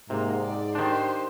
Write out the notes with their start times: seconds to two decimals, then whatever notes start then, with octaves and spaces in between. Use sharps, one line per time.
0.10 G#2 C3 A#3
0.42 D5
0.75 D#3 D4 G4 C5